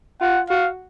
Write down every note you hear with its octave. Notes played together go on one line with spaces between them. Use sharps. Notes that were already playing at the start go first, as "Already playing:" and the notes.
F4 F#5
F#4 F5